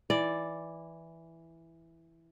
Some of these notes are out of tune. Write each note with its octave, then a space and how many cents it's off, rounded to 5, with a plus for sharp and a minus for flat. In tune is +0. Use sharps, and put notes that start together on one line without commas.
E3 +0 D5 +0